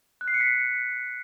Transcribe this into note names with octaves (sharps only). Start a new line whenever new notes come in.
F#6
C7
C#7
B6